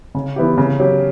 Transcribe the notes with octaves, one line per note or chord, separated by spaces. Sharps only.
C#3
E3 B3 E4 G4
C#3
F#3 C#4 G4